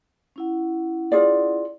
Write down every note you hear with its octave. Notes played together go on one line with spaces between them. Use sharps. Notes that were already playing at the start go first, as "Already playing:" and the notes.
C#4 E4 F#5
F4 G#4 D5